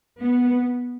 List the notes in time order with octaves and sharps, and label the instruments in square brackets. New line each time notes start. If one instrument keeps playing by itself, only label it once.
[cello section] B3